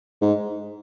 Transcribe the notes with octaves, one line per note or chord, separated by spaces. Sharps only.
G#2